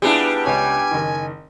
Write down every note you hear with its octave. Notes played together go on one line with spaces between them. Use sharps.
G3 B3 D4 E4 F4 G#4
C#2 C#5 G#5
F#1 D#3